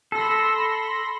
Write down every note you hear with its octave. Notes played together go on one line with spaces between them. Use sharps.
A4 B5 C6 A#6